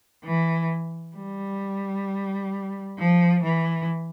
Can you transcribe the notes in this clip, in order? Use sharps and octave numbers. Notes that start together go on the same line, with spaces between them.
E3
G3
F3
E3